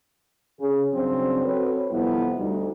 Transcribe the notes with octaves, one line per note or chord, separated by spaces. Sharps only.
C#3 G#4
G2 C#3 F#3 C4 D4 C5
C4 F#4 A4 B4 C#5
F2 C3 G3 B3 E4
D2 G3 D#4